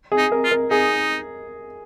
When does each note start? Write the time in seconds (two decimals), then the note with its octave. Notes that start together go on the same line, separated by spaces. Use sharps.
0.12 G#4
0.18 D#4
0.32 A#4
0.44 F4
0.51 A#4
0.70 D#4 G#4